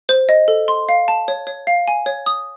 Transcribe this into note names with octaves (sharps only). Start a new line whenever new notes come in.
C5
D#5
A4
C6
F5
A5
C#5
C#5
F5
G#5
C#5
D#6